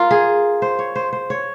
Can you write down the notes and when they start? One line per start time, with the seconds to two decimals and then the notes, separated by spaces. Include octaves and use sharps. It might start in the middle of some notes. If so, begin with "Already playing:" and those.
Already playing: F4 A#4
0.11 G#4
0.62 C5
0.79 C#5
0.96 C5
1.13 C5
1.30 C#5